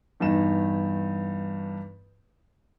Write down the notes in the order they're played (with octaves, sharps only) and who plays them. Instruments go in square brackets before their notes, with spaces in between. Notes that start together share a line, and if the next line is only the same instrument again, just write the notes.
[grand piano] E2 G2 D#4 E7